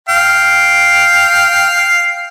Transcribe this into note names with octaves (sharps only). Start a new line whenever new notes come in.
F5 G5